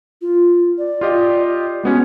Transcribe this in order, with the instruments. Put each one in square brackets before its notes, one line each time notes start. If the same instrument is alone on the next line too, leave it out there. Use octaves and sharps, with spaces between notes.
[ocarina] F4
D5
[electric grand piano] F4 G4 D#5
[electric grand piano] G#3 B3 C#4 [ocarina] F#4